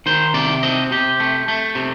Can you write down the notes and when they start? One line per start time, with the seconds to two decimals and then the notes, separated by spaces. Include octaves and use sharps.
0.06 D#3 C5
0.34 C3 D5
0.63 C4 D#5
0.91 C3 G4
1.20 A3
1.48 A3
1.75 C3